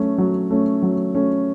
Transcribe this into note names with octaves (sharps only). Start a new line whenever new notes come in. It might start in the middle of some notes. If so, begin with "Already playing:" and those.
Already playing: F#3 A3 C#4
F#3
A3 C#4
F#3
A3 C#4